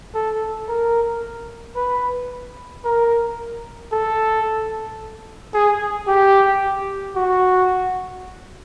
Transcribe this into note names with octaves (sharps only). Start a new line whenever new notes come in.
A4
A#4
B4
A#4
A4
G#4
G4
F#4